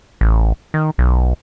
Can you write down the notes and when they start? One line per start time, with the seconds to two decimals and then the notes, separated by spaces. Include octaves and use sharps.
0.21 A1
0.74 D#3
0.98 B1